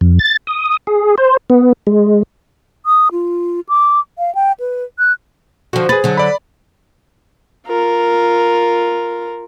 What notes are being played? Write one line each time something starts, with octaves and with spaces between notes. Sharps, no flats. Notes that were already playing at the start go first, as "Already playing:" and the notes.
F2
A6
D#6
G#4
C5
B3
G#3
D#6
F4
D6
F5
G5
B4
F#6
D3 F3 F#4
G#4 B4 A6
D3 F#3
D5 B5
F4 A#4